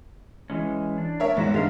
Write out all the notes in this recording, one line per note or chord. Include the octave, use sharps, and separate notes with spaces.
E3 G#3 C#4
D4
A#4 C#5 E5
E2 G#2 F#3 E5
G2 G#3 F4 F5